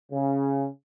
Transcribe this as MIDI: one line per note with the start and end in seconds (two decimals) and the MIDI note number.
0.11 0.67 49